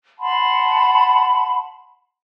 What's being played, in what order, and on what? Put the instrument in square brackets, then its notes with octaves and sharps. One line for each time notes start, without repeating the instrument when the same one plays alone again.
[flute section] F#5 A5 B5 C6